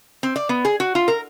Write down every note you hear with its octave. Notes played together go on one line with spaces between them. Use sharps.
C4
D5
B3
G#4
F#4
F4
A#4